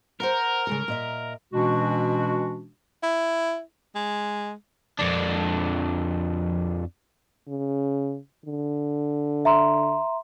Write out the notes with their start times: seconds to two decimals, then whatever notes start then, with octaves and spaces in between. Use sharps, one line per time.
0.20 A#4 C5 F#5 A#5
0.67 C#3 G#3 A4
0.88 A#2 D#5 E5
1.53 B2 E3 G#3 C#4 D4 F#4
3.03 E4
3.95 G#3
4.99 F2 D4
7.48 C#3
8.45 D3
9.45 E5 A#5 C6